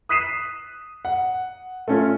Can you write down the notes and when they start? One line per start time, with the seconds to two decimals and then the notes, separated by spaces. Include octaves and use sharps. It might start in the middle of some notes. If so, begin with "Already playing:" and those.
0.09 D#6 F#6 B6 C7 D#7 E7
1.05 F#5
1.88 A3 C#4 F4